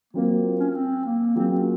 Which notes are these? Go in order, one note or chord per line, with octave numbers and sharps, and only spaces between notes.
F#3 A#3 C4 F4 A#4
C#4
C#4
C4
A#3
F#3 A#3 C4 F4 G#4
C4
C#4